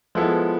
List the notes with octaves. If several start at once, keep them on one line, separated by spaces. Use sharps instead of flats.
F3 G#3 B3 E4 A4